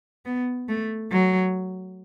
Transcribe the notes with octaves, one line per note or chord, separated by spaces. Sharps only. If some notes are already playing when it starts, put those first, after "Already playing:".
B3
A3
F#3